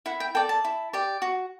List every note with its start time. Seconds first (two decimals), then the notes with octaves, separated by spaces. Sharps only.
0.06 E4 F#5
0.20 G5
0.35 A4 D5 G5
0.49 A5
0.64 E4
0.93 G4 D5
1.22 F#4